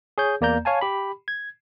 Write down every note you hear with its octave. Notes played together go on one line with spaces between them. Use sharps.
G#4 C#5 G6
E2 A#3 D5 A#5 G6
C#5 F5 G#5 A5
G4 B5
G#6